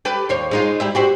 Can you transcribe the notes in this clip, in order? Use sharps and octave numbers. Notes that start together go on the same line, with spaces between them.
G4 A4 B4
D#2 C5 C#5
G#3 D#4 F4
E4 G4 E5
F#4 G4 C5